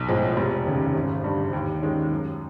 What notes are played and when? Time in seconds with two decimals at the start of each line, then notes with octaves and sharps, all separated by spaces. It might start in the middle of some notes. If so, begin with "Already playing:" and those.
Already playing: B1
0.09 A2 F3 G#3
0.37 F1
0.66 D#2 C#3
0.95 G#1
1.24 G2 D3
1.53 D#2
1.83 D#3 G#3 C#4
2.11 F#2